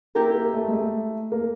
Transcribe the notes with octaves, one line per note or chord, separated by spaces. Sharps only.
A#3 E4 G4 A#4
A#3
A3
G#3
A3
A#3